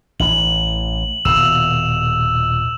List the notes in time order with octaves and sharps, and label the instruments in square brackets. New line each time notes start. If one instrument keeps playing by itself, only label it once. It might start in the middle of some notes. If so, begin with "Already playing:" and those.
[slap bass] A1 E3 [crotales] F#7
[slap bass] D#1 B2 [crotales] E6 E7 F7